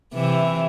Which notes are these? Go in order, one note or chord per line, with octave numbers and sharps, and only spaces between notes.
C3 E3